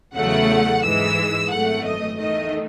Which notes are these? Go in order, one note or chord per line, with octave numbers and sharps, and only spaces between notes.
E2 C#3 F#3 A3 F#5
G#2 E3 G#3 E6
G#1 F#2 E3 A3 F#5
D#5
E2 D#3 A3 D#5